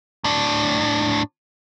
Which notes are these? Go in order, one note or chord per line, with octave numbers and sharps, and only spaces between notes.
A2 D4